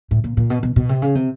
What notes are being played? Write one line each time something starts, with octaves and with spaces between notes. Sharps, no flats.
A2
A#2
A#2
B2
B2
B2
C3
C#3
C3